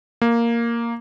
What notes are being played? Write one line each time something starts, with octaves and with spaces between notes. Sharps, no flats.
A#3